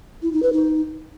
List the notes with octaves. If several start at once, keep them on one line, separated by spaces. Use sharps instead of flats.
E4
D#4
B4
D#4